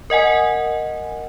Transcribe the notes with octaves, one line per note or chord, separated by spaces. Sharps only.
A#4 D#5 F#5 G#5